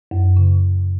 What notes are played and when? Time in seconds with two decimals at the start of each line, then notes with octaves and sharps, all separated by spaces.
0.11 F#2
0.37 C#3